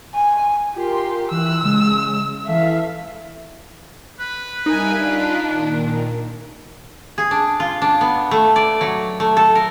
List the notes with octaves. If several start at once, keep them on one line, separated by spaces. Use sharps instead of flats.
G#5
F4 G4 A#4 C6
E3 E6 F#6
C#3 G#3
E3 A4 E5 F5
B4
G3 D#4 A#4 E5 F5 G#5
D4 F4 D#5 F5
A#2 D#3
G#4
D4
F4
D4
B3
A3
D5
F#3
A3
A4
A#4